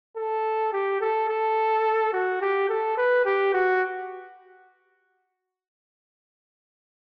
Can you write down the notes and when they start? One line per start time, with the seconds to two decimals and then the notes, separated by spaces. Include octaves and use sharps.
0.17 A4
0.73 G4
1.01 A4
1.28 A4
2.13 F#4
2.41 G4
2.69 A4
2.98 B4
3.25 G4
3.54 F#4